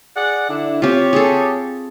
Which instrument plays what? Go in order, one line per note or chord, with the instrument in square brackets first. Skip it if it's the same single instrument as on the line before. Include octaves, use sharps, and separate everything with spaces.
[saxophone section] G#4 D5 F#5
D3 D4 E4
[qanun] C4 F4 [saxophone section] G4 C#5
[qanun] G#4 A4